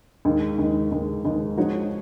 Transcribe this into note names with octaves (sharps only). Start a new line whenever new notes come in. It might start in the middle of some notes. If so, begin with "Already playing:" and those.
D#2 D#3 G#3
D#2 D#3 G#3
D#2 D#3 G#3
D#2 D#3 G#3
F3 G#3 D#4 F#4 C#5